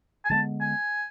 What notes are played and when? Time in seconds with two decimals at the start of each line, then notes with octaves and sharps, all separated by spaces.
0.25 G#5
0.30 D3 G#3 B3 A5
0.61 G#5